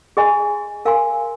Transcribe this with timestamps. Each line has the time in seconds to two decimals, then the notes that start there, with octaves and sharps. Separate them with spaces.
0.17 G#4 D#5 G#5 C6
0.85 A#4 F5 G#5 C6